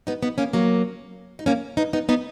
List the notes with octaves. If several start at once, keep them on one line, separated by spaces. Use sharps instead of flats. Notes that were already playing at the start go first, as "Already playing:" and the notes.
B3 D#4
B3 D#4
A#3 C#4
F#3 A#3
D#4
A#3 C#4
B3 D#4
B3 D#4
B3 D#4